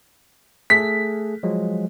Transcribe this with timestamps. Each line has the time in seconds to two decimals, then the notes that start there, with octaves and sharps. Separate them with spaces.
0.70 A3 G#4 A4 B6
1.43 F3 F#3 G#3